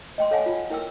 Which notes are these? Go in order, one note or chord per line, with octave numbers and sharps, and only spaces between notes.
D#5 G5 C6
A4 C#5 F5 F#5 G#5 A5
F4
E4 A#4 G5 E6